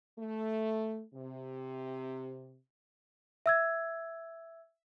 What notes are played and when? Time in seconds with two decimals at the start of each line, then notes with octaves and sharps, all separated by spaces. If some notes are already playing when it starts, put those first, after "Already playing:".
0.18 A3
1.14 C3
3.46 E5 E6 G#6